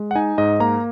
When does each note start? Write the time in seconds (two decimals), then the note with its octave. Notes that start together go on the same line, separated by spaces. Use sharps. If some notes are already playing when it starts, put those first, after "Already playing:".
Already playing: G#3
0.11 F#5
0.15 D#4 G#5
0.38 G#2 D#5
0.60 A#3 A#5